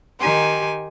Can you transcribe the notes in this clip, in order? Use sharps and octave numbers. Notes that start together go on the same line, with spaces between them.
D#3 D#4 G4 G#5 C6